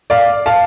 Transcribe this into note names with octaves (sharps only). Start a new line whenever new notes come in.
D5 F5
F5 A5